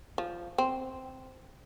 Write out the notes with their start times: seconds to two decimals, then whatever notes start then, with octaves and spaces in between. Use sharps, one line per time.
0.18 F3
0.58 C4